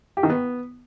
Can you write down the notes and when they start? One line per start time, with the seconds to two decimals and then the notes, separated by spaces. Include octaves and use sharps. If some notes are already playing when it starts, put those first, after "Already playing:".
0.17 G4
0.23 D#3
0.30 B3